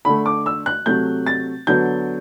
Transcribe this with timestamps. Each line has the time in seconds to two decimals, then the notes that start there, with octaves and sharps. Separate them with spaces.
0.05 D3 A3 B5
0.26 D6
0.46 E6
0.66 F#6
0.86 C3 F#3 A3 G6
1.26 A6
1.67 D3 F#3 B3 G6